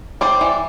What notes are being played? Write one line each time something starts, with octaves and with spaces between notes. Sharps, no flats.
G3 C5 D5
E3